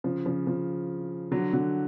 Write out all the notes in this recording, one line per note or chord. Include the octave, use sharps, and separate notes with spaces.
C#3 F3
C#3 F3
C#3 F3
D3 F#3
D3 F#3